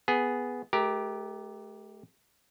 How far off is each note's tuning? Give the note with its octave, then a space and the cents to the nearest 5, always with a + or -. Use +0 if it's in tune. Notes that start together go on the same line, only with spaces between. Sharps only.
B3 +0 G#4 +0
A3 -40 G4 +0 A#4 +10